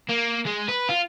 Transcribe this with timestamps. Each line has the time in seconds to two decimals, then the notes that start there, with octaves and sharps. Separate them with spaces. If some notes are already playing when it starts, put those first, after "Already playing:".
0.09 A#3
0.47 G#3
0.69 B4
0.89 F4